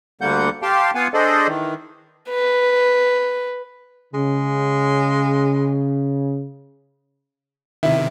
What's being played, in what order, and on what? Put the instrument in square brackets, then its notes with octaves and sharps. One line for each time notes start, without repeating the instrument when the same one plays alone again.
[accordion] D2 D3 G3 A#3 F#5 G6
G4 F5 G5 A5 C6
B3 F4 F5 F#5 G#5
D4 G#4 A4 C5 D5 D#5
D#3 E3
[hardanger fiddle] B4
[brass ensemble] C#3 [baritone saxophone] G#3
[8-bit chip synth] C3 D#3 [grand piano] E4